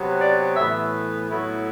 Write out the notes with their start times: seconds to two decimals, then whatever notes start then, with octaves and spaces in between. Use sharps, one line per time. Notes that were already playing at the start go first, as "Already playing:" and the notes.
Already playing: C3 F#3 B3
0.21 D5
0.57 A2 E3 B3 E5
1.30 A2 F#3 B3 E4